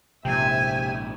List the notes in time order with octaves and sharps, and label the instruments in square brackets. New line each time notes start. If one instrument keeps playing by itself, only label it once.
[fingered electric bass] A#1 G#2 [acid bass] C3 [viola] E5 G#5 [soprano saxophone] G5